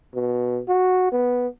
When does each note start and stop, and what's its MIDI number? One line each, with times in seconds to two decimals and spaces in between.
0.15 0.61 47
0.69 1.09 66
1.12 1.47 59